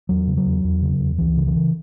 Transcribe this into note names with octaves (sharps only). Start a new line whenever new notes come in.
E2 F#3
C#3
F#3
E2
E2
C#3
E2
C#2 E3
C#3
E3
C#3